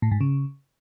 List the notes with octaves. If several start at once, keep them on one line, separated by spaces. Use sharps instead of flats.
A2
G#2
C#3